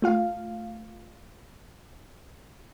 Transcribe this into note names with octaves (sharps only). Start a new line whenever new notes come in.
A3 F4 F5